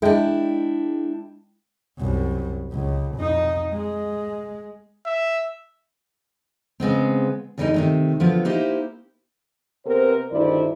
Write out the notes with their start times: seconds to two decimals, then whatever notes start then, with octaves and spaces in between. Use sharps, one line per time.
0.02 G#3 D4 E4 G5
1.98 C2 F#2
2.71 C#2
3.16 F2 D#4
3.72 G#3
5.06 E5
6.80 C#3 G#3 B3 C4
7.58 E2 D3 E3 G3 C#4 D#4
7.74 C3 D#3 A3
8.20 D3 F3 F#3 B3 F4
8.45 A#3 D#4 E4 G4 C5
9.86 C3 B3 A#4 C5
10.31 D2 G2 D#3 E4 C5 D5